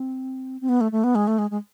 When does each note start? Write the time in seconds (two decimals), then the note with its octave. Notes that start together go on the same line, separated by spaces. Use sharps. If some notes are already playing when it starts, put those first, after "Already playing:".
Already playing: C4
0.61 C4
0.69 B3
0.81 A3
0.92 A3
1.04 B3
1.15 G#3
1.27 A3
1.38 G#3
1.51 G#3